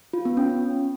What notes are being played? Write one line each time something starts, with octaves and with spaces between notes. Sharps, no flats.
F4
B3
C#4